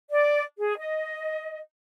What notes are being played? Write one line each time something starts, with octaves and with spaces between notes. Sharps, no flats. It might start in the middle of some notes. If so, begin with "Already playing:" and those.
D5
G#4
D#5